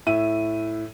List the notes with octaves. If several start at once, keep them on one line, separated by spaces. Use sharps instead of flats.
A2 E5 D#7